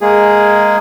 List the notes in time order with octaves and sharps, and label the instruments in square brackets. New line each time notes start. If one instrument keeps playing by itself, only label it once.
[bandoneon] G#3 A#3 G#4